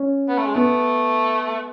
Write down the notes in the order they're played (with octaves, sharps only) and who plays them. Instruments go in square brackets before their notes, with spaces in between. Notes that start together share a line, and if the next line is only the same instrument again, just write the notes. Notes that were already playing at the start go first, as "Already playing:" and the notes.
Already playing: [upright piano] C#4
[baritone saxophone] B3
A3
G#3
[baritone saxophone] A3 [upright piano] B3